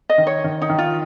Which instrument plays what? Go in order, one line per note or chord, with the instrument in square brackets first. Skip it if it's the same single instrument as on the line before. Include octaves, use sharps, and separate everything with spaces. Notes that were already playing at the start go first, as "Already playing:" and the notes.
[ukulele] D#5
[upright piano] D#3
[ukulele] C#5
[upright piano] D#3
[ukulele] D#4
[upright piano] D#3
[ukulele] F4